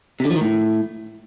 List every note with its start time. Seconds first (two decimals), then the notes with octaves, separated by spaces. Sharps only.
0.20 C3
0.25 D3
0.31 F3
0.36 D#3
0.41 A2